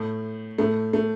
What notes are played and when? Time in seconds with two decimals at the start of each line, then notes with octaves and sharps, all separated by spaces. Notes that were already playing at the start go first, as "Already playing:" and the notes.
Already playing: A2 A3
0.58 A2 A3
0.93 A3